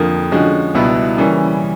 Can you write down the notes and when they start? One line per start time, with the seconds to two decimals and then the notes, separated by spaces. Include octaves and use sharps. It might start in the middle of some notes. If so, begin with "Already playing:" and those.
Already playing: F2 D3 F3 A#3
0.32 D3 F3 G#3 C#4 F#4
0.74 C#2 B2 G3 B3 E4
1.17 C#3 E3 G3 A#3 C#4